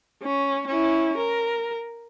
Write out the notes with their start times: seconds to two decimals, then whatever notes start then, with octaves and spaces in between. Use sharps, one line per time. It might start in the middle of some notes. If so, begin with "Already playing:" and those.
0.23 C#4
0.67 C#4 E4
1.17 A#4